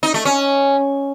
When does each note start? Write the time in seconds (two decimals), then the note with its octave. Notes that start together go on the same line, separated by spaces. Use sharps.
0.03 D#4
0.14 A3
0.25 C#4